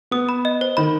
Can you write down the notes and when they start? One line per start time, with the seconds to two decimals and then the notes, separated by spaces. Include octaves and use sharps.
0.11 B3 D#6
0.29 B5
0.45 D#5
0.61 C5
0.77 D#3 B5